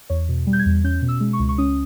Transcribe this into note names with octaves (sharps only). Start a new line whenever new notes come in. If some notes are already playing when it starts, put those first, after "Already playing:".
E2 C#5
B2
G3
G6
G#6
E2
C#4 G6
B2
E6
G#3
C#6
C#2
C#6
C#4 D#6